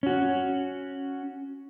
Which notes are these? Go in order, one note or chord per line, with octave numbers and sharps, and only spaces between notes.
C#4 F#4